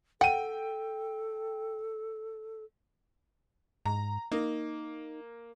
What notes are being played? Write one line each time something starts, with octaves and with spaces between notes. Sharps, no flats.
A4 F#5 G5 D#7
G#2 A#5
A#3 D#4